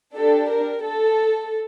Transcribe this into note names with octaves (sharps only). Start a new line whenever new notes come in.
D4 G4 A4
A#4
A4